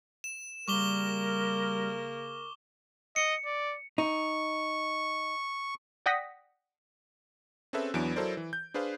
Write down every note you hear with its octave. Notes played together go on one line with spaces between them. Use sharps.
E7
C#3 G3 A#3 A#4 C#6 D6 G7
D#5 C#7
D5
D#4 C#6
D5 F#5 G5 D#6 A#6 B6
C4 C#4 G#4 A4 B4 E5
E2 E3 F#3 B3 D4 D7
F#3 E4 A4 A#4 C5 D5
E3
G6
D4 G#4 B4 C5 F5